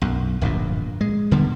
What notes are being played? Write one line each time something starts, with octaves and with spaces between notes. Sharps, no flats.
B1 F#2
D1 A#1 G2 A#2
G#3
E1 D3 G3 B3